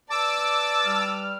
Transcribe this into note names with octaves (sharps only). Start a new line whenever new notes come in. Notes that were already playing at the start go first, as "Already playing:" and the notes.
B4 D5 A5 D6 E6
G3 F6